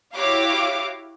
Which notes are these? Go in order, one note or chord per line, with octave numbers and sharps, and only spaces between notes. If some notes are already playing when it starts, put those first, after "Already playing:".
E4 F#4 G4 C#5 F5 D6